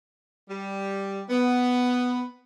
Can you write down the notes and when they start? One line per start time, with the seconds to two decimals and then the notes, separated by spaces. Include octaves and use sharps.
0.48 G3
1.29 B3